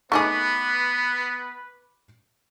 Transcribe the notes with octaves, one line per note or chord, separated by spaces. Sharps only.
A3 B3 D#4 G#4 B4 C#6 D6